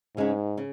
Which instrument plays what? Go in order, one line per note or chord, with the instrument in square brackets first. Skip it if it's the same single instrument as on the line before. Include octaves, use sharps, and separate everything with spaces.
[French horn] G#2 [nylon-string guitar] C#3 G#3 C#4
[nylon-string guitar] C#3